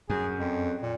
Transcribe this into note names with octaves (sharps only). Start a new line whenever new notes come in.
F#2 G#4
F2
A#2